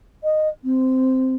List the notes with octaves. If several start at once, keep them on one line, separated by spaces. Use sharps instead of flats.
D#5
C4